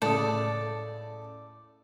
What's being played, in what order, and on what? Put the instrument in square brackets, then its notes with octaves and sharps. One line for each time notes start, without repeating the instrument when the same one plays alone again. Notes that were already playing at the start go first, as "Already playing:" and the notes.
[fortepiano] A2 C#3 D#6 [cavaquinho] A4 D5